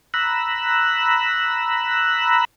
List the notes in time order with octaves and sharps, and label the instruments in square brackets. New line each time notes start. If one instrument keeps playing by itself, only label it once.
[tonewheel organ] A#5 B5 E6 F#6